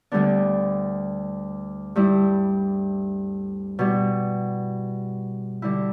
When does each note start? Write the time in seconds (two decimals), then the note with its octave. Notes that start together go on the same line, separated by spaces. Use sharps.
0.12 D2 D3 G3 B3 D4
1.96 G2 G3 E4
3.79 B2 G3 E4
5.62 D3 G3 E4